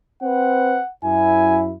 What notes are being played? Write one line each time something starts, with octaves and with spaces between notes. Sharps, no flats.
C4 B4 F#5
F#2 E4 G#5